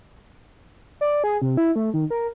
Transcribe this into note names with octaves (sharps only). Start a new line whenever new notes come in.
D5
G#4
C3
E4
A3
D#3
A#4